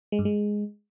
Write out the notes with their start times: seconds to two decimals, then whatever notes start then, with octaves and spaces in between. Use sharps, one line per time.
0.12 G#3
0.19 G2
0.25 G#3